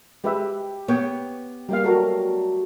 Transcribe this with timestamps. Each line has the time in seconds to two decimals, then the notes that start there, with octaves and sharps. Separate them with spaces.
0.24 G#3 G4 B4 E5
0.88 B3 C#5 G5
1.69 G3 A#3 G4 F5 C6 D6
1.84 F#3 G3 A3 F#4 A4 A#4